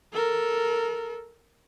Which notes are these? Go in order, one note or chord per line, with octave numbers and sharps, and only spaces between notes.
A4 A#4